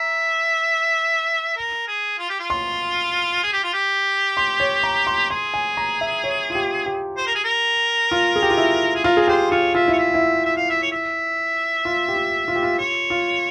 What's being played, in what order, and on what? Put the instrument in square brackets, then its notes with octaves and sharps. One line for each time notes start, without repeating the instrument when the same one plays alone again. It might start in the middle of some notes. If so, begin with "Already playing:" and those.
Already playing: [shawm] E5 [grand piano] A#5
[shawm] A#4
G#4
F4
G4
F4
[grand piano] C6
[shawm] G#4
G4
F4
G4
[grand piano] C6
C#5
A#5
C6
[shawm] G#4 [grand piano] C6
[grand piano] G#5
A#5
E5
C#5
F4
G4
G4
[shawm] C5
A#4
G#4
A#4
[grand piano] F4
G#4
G4
F4
E4
[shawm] G#4
[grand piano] F4 [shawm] A#4
[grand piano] G#4 [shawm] A#4
[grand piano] G4 [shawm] C5
[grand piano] F4 [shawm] C#5
[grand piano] F4 [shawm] E5
[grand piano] E4
[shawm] C#5
E5
[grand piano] E4
[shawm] E5
F5
E5
C#5
E5
[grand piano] F4
G4
F4
F4
G4
F4
[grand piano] F4 [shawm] C#5
[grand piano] F4